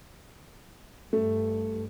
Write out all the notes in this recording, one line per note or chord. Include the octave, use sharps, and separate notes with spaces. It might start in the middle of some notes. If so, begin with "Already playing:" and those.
G2 A3